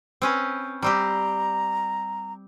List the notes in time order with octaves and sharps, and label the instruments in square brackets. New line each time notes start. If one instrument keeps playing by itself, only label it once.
[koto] C4 C#4 B4
[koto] G3 C4 G4 [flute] A#5